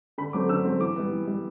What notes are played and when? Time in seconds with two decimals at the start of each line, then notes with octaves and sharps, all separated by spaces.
0.18 D3 B5
0.33 F#3 A3 C4 D6
0.49 D3 E6
0.65 F#3 A3 C4
0.80 E3 D6
0.96 G3 B3
1.12 E3
1.28 G3 B3